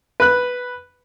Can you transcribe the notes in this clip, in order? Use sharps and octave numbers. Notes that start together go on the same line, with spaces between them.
B4 F#6